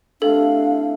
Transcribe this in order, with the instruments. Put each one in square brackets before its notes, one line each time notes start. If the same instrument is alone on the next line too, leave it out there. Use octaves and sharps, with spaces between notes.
[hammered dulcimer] A2 C3 [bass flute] D4 [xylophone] A4 [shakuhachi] F5